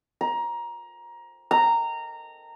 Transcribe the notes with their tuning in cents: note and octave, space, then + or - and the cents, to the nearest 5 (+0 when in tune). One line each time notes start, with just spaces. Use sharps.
A#5 +20
A#5 -15